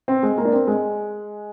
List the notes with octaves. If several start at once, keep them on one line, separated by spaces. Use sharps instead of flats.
C4
G#3
A#3
D4
C4
G#3